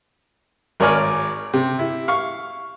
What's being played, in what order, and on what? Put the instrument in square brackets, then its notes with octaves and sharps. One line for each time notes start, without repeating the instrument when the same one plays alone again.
[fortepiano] G#1 A#4 C#5 D5 G#5 F6
C3
E4
F5 C#6